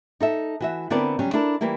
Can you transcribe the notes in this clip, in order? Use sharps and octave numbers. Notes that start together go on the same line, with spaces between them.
D#4 A4 E5
E3 F#4 E5
D3 B3 C4 E4 A#4 D5
C#3 F#3 G3 C#4
D4 E4 A4 A#4
E3 G3 A#3 E4